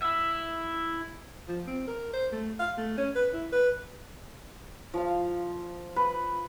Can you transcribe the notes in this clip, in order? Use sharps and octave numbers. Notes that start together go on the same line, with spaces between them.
E4 E5
F3
C4
A#4
C5
A3
F5
A3
C#4
B4
E4
B4
F3 F5
B4